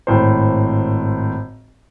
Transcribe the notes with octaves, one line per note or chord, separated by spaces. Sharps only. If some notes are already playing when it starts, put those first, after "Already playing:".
G#1 A2 C5